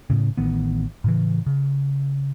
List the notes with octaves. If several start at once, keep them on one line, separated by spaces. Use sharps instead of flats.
A2 C#3
A1 D#3 B3
A2 C#3 E3
C#3